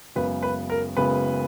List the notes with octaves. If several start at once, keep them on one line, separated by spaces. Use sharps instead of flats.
F#1 F#2 C#3 G#3 B3 B4
B4
A#4
F#1 F#2 C#3 G#3 B3 B4